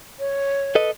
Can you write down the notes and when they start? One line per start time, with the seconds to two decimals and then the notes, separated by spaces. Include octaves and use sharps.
0.19 C#5
0.75 A4 B4 D#5